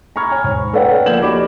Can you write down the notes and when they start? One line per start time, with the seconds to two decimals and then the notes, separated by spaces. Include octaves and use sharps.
0.16 A#5 B5 C#6 F6 G#6
0.31 C#5 G#5
0.44 G#2
0.74 A4 B4 C#5 D5 F#5 G5
1.06 F3 A#3 G6 G#6 E7 F#7
1.22 D#4 F#4 G4 D5 B5 D6